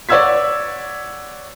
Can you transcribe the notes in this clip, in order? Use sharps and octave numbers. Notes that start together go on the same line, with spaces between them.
C#5 D5 F#5 E6 G#6 B6